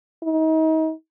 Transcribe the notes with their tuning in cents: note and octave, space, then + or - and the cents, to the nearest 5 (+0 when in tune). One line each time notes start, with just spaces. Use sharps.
D#4 +35